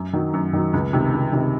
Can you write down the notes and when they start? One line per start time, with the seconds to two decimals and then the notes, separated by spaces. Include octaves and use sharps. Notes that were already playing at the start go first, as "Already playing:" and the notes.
Already playing: F#2
0.13 D#3 F#3
0.33 F#2
0.53 D#3 F#3
0.73 C#2
0.93 C3 D#3
1.13 C#2
1.33 C3 D#3